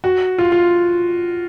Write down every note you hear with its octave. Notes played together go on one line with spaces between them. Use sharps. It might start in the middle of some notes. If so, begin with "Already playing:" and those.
F#4
F4
F4